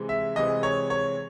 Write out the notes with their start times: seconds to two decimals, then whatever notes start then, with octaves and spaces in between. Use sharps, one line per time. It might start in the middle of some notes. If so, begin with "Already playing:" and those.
Already playing: C3 E3 G#3
0.09 E5
0.36 C3 E3 G#3 D#5
0.63 C#5
0.90 C#5